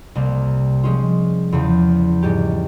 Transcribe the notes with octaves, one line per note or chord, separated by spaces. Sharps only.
C2 C3 G3 A#3
F3 G#3 C#4 F4
E2 C#3 F3
G#2 G3 C#4 G4